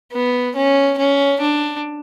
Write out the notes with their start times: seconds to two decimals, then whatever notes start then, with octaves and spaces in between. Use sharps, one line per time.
0.13 B3
0.56 C#4
0.98 C#4
1.40 D4